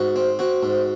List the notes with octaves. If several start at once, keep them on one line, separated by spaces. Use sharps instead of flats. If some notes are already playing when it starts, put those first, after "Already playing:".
Already playing: G#2 F#4
C4
C4 F#4
G#2